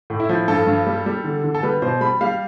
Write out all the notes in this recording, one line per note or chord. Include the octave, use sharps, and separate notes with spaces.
A2
E4
F3
G2 A4
G2
G3
G3
D3
D3
A4
G3 B4
B2 C5
G3 B5
G3 F5